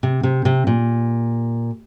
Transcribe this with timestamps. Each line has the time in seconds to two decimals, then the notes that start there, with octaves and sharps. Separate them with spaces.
0.03 C3
0.23 C3
0.45 C3
0.67 A#2